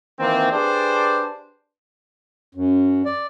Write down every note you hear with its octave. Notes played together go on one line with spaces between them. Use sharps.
D#3 E3 A#3 C4
D4 G4 G#4 B4 C5 D5
F#2
D5